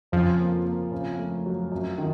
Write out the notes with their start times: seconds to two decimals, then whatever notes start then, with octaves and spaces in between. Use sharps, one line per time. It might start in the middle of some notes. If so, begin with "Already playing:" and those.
0.12 F2 C#3 F3
0.39 A#3
0.65 A#3
0.92 C#3
1.19 A3
1.46 F#3
1.72 F#2
1.98 D#3